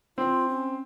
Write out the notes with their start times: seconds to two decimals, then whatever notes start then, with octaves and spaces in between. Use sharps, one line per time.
0.18 C4 F4
0.48 C#4